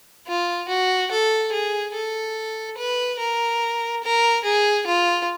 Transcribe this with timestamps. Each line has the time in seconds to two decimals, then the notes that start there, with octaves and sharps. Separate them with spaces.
0.27 F4
0.68 F#4
1.11 A4
1.53 G#4
1.94 A4
2.78 B4
3.19 A#4
4.03 A#4
4.44 G#4
4.87 F4